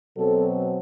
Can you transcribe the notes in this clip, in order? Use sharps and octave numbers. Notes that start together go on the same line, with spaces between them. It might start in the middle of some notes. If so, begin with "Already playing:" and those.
B2 F#3 C4 A4